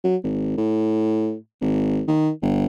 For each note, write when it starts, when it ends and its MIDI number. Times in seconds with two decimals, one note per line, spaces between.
0.04 0.16 54
0.24 0.57 32
0.57 1.35 45
1.61 2.02 32
2.08 2.31 51
2.42 2.66 31